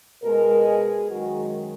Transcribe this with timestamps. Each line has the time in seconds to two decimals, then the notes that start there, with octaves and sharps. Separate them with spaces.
0.23 B2 G#3 A#4
0.68 G#4
1.11 F#2 D#3 G#3 F#4